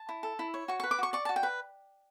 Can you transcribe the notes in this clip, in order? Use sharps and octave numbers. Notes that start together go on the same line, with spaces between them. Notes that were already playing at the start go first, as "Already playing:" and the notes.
Already playing: A5
E4
A4
E4
C#5
F#4 C#6
B4 C#6
D6
F#4 C#6
D5 C#6
F#4 A5
G5
B4